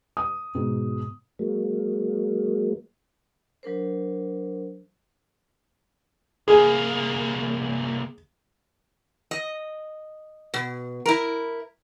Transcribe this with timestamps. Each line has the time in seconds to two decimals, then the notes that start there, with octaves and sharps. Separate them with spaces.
0.17 D#6
0.55 G#2 B2
1.39 F#3 G#3 A#3
3.63 F#3 D4 A#4 C5
6.48 C2 A#3 G#4
9.31 D#5
10.54 B2
11.06 E4 A#4